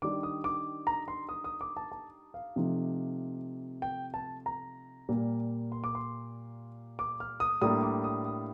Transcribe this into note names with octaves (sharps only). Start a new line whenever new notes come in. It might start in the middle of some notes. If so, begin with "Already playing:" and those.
D#3 G3 D4 D6
D#6
D6
A#5
C6
D#6
D#6
D6
A5
A5
F5
C3 F3 A3 D#4
G5
A5
A#5
A#2 G3 A#3
C6
D6
C6
D6
F6
D#6
A2 G3 A#3 D4 D#6
D6
D#6
D#6